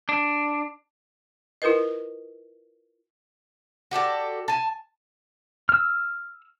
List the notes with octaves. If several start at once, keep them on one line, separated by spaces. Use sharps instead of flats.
D4
E4 F4 A#4 B4 D#5
F#4 G4 A4 D5
G#5 A5
E6 F6